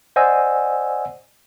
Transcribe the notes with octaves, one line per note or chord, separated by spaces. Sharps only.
C5 D5 D#5 F#5 G#5 E6